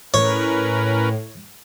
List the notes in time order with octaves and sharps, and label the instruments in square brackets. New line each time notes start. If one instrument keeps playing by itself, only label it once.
[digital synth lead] A2 [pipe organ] C#4 A#4 B4 [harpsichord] C#5